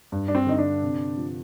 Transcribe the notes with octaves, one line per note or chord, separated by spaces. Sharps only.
G2
D4
C4
D3 D#4
D4
C3
F3